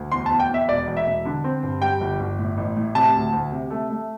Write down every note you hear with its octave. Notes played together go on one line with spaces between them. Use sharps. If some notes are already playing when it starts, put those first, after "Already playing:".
Already playing: D2
E2 C6
A5
E2
G5
E2 E5
E1 D5
E1
E5
E1
D3
C4
G2
G3 G5
G1
G1
A2
A1
A2
C3 A5
D2
D2
C3
A3
A3